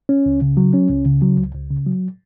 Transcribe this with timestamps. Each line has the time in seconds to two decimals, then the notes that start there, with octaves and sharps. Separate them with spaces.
0.09 C#4
0.26 C#2
0.42 C#3
0.57 F#3
0.74 C#4
0.90 C#2
1.06 C#3
1.22 F#3
1.38 C#2
1.55 C#2
1.70 C#3
1.86 F#3